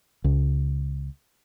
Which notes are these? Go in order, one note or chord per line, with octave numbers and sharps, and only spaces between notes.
C#2